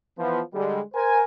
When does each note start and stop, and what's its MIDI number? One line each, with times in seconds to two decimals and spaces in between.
0.18 0.41 52
0.18 0.41 53
0.18 0.41 59
0.54 0.81 50
0.54 0.81 55
0.54 0.81 56
0.94 1.22 70
0.94 1.22 72
0.94 1.22 80